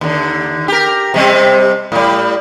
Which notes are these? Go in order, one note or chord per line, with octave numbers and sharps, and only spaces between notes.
D#2 D3
G4 A#4
C3 G3 C4
A2 G3